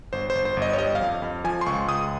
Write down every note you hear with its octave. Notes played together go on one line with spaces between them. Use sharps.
G1 C5
C5
G1
C5
G1
D#5
C#5
G3 D#5
F5
F2
F2
F3 G#5
C6
C#2 C#6
C#2 D#6